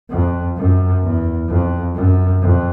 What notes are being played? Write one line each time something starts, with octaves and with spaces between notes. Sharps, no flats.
F2
F#2
E2
F2
F#2
F2